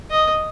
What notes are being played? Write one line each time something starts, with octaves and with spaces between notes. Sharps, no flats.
D#5